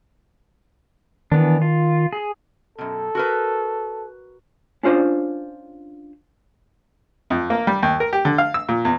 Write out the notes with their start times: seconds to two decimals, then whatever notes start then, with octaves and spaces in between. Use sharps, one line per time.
1.32 D#3 E3 B3 D4
1.62 F4
2.13 G#4
2.78 F#2 B2 A4
3.15 F#4 A#4 B4
4.83 C#4 D4 F4 C5
7.30 F2
7.50 A#3
7.67 G3
7.83 D#2
8.00 A#4
8.13 G4
8.25 D3
8.38 F5
8.54 E6
8.69 A#2
8.85 E2